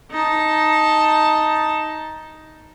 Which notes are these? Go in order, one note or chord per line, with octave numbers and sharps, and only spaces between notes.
D#4 A5